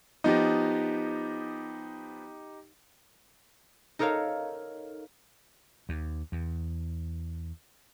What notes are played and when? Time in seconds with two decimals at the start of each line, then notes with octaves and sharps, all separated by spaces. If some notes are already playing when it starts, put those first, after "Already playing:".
0.24 F3 B3 D#4 G4 D#5
3.99 D#4 A4 A#4 C#5 F5
5.89 D#2
6.32 E2